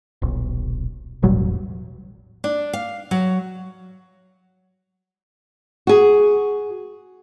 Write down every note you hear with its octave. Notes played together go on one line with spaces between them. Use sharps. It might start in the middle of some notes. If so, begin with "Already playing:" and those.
D#1 B1
E1 A1 B2 F#3 G3
D4
F5
F#3
F#4 G#4